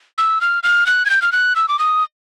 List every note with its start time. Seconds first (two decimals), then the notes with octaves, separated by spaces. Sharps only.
0.18 E6
0.41 F6
0.63 F6
0.86 F#6
1.06 G#6
1.10 G6
1.22 F6
1.32 F#6
1.56 E6
1.68 D6
1.79 D#6